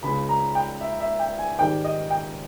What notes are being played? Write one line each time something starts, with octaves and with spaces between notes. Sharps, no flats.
C#2 C#3 G#3 B5
A#5
G5
E5
E5
G5
G#5
G#2 D#3 G3 G5
D#5
G5